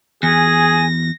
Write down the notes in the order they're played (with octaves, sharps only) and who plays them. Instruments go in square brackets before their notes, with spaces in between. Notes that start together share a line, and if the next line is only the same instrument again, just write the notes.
[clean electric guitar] E2 [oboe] G#4 [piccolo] G#5 [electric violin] A#6